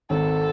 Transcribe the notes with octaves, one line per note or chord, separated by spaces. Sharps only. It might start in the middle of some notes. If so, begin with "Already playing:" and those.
G#1 A4